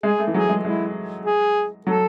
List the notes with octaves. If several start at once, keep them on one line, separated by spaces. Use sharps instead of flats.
G#3 G#4
A3
E3
F#3 G#4
G#3
G#3 E4
G#4
F#3 A4